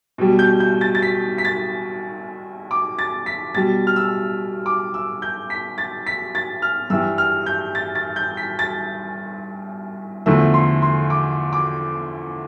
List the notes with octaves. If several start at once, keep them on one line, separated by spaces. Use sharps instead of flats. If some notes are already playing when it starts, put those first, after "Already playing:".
B2 G3
G6
G6
A6
A6
B6
B6
A6
D6
A6
B6
B2 G3 A6
F6
E6
D6
E6
G6
B6
A6
B6
A6
F6
G2 E3 G3 E6
F6
G6
A6
A6
G6
B6
A6
E2 D3 F3 A3 E6
C6
C6
D6
D6